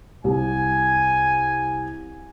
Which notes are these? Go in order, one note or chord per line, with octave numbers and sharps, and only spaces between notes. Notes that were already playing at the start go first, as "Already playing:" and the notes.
C2 G#5